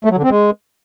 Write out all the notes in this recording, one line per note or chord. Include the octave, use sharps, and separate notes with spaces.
A3
F#3
D3
C4
G#3